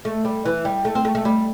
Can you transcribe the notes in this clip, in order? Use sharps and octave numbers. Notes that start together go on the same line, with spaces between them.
A3
G3
E3
G3
A3
C4
A3
A3
G3